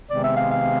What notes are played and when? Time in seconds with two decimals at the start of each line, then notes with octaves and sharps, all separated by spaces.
0.09 C3 D#3 G#3 B3 D5
0.23 E5
0.36 F5
0.49 F5